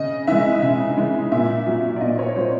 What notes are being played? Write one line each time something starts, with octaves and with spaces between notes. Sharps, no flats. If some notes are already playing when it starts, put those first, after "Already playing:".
Already playing: C#3 D#5
E3 G#3 E5
C#3 E5
E3 G#3
A#2 E5
F#3
D5
A#2 D#5
C#5
F#3 C5